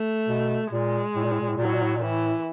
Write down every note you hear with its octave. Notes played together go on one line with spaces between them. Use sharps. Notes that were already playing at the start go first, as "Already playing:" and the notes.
Already playing: A3
B2
A#2 G#3
A2
A#2
A2
A#2
A2
A#2 F#3
A2
A#2
A2
A#2
A2 E3